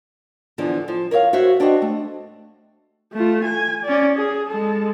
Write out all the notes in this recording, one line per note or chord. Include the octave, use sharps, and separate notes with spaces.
E2 D3 E3 F3
F3
A#4 C#5 E5 F5
F#4 C5 C#5 E5 F#5
D4 F#4 G4 C5 D#5
A3
A3 F4
G#5
C#4 D5
G#4
G#3 A4